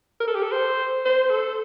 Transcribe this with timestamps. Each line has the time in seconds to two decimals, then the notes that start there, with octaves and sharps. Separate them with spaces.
0.20 A#4
0.27 A4
0.35 G4
0.43 A4
0.52 C5
1.05 C5
1.30 A4